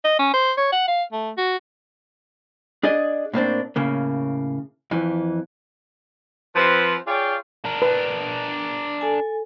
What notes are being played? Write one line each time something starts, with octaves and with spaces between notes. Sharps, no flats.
D#5
C#4
C5
C#5
F#5
F5
A3
F#4
D4 G#4 D5 D#5
A2 A#3 C4 D4
A2 C#3 A#3
F2 E3
F3 C4 B4
F4 G#4 C#5 D5 F5 G5
D4 A#4
B4
A4 G#5